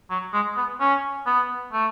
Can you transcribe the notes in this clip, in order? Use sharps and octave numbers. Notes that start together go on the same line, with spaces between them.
F#3
G#3
B3
C#4
B3
A3